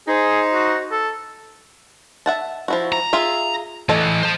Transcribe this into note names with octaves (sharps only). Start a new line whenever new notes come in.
D#4 G#4 C5
F#4
A4
E5 F#5 A5
F3 E4 F#4
A#5
F4 G#4 E5
E3 A3 A4 D#5
C5 A5